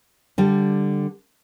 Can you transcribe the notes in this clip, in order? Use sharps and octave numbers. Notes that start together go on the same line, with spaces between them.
D3 G3